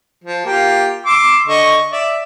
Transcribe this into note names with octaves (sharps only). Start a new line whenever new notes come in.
F3
A#3 F4 G4
C6 D6 E6
D3 D#5 C#6
D5 E5